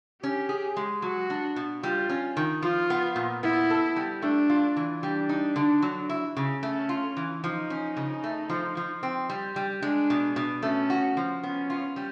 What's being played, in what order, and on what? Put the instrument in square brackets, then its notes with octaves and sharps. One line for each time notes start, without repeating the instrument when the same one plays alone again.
[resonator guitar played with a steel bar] C#4 [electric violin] G4
[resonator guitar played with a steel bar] G#4
G#3
[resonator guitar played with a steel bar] F#3 [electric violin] F#4
[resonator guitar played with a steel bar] D4
B2
[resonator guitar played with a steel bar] G3 [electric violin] F4
[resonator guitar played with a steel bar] C#4
D#3
[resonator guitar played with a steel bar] F3 [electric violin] F4
[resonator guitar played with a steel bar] B3
A#2
[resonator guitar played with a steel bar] B3 [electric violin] E4
[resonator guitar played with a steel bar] A4
G3
[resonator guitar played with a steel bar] A3 [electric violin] D4
[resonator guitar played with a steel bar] F4
E3
[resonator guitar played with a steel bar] G3 [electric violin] D4
[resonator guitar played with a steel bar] D#4
D3
F#3
E4
C#3
[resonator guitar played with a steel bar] A3 [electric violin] C#4
[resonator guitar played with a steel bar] F4
E3
[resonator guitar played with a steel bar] F3 [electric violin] D#4
[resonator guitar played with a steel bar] C#4
C#3
A3
F3
F3
C4
G3
G3
[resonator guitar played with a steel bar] G#3 [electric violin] D4
[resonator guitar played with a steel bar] B2
B2
[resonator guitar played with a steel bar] A3 [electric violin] C#4
[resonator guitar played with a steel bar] F#4
F3
[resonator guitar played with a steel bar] B3 [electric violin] C#4
[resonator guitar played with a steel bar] F4
G3